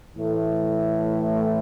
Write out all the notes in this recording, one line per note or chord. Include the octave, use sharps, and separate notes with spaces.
A2 E3 A3